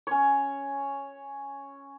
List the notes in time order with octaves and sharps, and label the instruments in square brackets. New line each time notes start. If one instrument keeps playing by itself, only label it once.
[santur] C#4 C#5